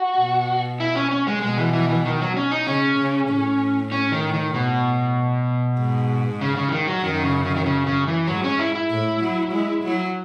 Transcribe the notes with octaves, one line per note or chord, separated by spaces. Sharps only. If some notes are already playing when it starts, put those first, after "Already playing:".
Already playing: F#4
B2
E4
C#4
C#4
G#3
B2 G#3
E3
E3
E3
D#3
F#3
C#4
D#4
C#3 C#4
C#3
A2
C#4
D#3
D#3
B2
G#2
C#3
C#3
E3
D#3
F#3
F#2 D#3
C#3
C#3
D#3
C#3
C#3
E3
G#2 F#3
C#4
E4
E4
A2
F#3
G#3
F#3